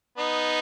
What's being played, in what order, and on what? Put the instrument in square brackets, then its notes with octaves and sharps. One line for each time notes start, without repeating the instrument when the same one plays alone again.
[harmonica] B3 D#4